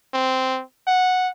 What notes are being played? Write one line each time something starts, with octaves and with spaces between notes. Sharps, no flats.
C4
F#5